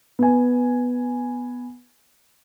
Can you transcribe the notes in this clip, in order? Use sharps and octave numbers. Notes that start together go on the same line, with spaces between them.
B3 G#5